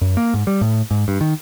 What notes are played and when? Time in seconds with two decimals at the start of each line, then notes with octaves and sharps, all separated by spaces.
0.01 F#2
0.17 A#3
0.34 G#2
0.47 G3
0.61 A2
0.91 G#2
1.08 G2
1.21 D#3